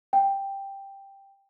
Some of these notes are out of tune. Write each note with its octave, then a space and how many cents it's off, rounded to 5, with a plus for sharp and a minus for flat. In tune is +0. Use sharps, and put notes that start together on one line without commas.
G5 +5